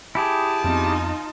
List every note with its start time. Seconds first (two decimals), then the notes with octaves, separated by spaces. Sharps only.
0.15 E4 G4 G#4 A5
0.64 F2 B3 C4 D#4 F4